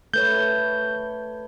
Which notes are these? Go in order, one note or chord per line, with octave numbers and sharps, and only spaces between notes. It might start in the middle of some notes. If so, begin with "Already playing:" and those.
A3 B4 C#5 G6